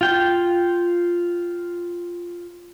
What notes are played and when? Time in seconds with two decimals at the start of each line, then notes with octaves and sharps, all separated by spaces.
0.01 F4 G5